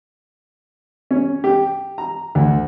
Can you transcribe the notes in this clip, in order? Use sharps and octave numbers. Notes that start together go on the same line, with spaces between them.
C#4
G4
A#5
D2